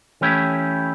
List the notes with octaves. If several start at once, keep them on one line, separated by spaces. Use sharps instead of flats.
E3 A3 C#4 E4 G4